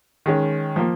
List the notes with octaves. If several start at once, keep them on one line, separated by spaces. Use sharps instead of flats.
D#3 G#3 C#4
F3 A#3